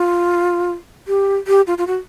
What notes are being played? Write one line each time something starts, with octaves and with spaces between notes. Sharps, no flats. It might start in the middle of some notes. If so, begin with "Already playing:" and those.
Already playing: F4
G4
G4
F4
F4
F#4